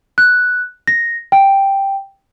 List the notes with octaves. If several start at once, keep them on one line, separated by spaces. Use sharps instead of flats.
F#6
A#6
G5